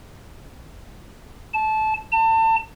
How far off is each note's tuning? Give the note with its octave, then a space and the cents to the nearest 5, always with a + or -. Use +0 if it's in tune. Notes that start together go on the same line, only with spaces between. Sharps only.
A5 -20
A5 +30